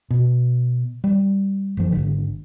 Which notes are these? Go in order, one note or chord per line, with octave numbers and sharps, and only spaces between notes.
B2
G3
F#1 F3
G#1 D3